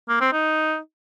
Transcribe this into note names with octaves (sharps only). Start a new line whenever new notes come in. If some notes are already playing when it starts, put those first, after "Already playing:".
A#3
C4
D#4